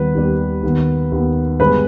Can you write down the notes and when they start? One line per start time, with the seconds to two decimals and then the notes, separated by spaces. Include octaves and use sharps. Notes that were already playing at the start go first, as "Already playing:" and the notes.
Already playing: D#2 D#3 G3 B3 B4
0.15 D#2 D#3 G3 B3
0.63 D#2 D#3 B3
1.11 D#2 D#3 B3
1.60 G2 D3 G#3 B3 B4 B5